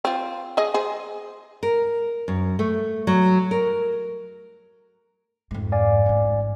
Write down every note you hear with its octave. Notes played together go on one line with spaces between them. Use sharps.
C4 F4
G#4 D#5
G#4 C5
A#4
F#2
A3
F#3
A#4
F2 G#2
D5 F5 G#5
A1 G#2